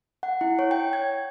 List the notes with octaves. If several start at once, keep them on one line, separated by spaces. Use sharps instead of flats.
F#5
E4
C#5
G5
G#6